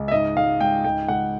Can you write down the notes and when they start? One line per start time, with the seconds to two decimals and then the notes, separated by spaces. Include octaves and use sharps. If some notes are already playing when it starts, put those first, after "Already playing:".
Already playing: C#2
0.08 E5
0.11 G#2 D#5
0.37 G#2 F5
0.60 G#2 G5
0.84 C#2 G5
1.08 C#2 F#5